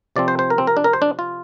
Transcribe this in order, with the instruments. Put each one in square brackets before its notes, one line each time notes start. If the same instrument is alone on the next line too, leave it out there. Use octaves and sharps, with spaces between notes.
[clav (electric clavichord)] C3 F3 C4 D5
C5
C5
A#4
C4
A#4
D4
A#4
C5
D4
F4